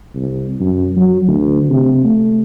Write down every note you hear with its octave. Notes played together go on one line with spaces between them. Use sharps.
C2
F#2
F#3
D2
C3
A3